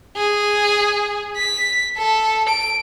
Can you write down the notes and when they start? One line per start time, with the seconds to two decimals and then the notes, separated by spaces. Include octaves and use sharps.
0.17 G#4
1.37 B6
1.98 A4
2.49 D7